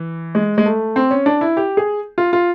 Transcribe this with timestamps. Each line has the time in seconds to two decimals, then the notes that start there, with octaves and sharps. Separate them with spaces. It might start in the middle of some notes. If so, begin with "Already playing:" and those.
Already playing: E3
0.35 G#3
0.58 G#3
0.66 A3
0.96 C4
1.11 C#4
1.26 D4
1.41 E4
1.57 G4
1.77 G#4
2.18 F4
2.33 F4